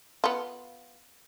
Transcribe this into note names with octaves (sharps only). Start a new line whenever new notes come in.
B3 F4